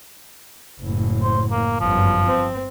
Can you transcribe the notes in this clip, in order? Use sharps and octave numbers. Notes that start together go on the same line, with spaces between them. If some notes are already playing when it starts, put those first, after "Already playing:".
F#1 A2
C5
A#3
G1 F#2 F3
C4